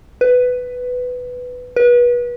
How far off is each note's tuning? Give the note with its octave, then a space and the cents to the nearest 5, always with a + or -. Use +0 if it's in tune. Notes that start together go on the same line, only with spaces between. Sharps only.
B4 +10
B4 -30